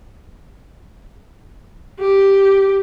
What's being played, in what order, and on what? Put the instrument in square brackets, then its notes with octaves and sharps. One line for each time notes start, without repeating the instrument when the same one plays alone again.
[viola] G4